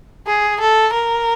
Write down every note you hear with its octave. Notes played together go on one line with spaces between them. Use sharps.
G#4
A4
A#4